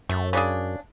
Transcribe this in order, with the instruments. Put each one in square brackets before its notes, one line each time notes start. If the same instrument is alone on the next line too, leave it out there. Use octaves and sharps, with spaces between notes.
[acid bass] F#2 [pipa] A3
[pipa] C#3 D4 G#4